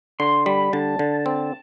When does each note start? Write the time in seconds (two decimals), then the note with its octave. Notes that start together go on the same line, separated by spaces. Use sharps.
0.20 D3 C6
0.46 G3 B5
0.73 D3 A5
0.99 D3
1.26 C4